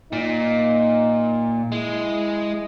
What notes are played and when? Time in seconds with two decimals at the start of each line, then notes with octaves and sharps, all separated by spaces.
0.12 A#2 D#4
1.72 G#3 E4